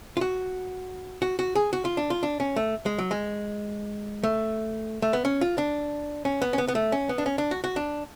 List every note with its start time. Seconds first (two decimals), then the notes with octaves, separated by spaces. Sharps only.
0.17 F4
0.21 F#4
1.22 F#4
1.39 F#4
1.55 G#4
1.73 F#4
1.85 F4
1.97 D4
2.10 F4
2.23 D4
2.40 C#4
2.56 A3
2.86 G#3
2.98 F#3
3.11 G#3
4.23 A3
5.02 A3
5.13 B3
5.25 C#4
5.41 F4
5.58 D4
6.25 C#4
6.42 B3
6.53 C#4
6.58 B3
6.68 B3
6.75 A3
6.92 C#4
7.09 B3
7.18 D4
7.26 C#4
7.38 D4
7.51 F#4
7.64 F#4
7.76 D4